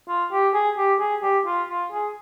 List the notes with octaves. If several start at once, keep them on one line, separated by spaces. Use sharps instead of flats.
F4
G4
G#4
G4
G#4
G4
F4
F4
G#4